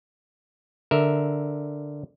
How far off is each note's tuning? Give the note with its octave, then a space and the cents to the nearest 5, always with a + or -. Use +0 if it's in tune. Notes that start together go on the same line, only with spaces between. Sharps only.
D3 +0 A#4 +0 E5 -5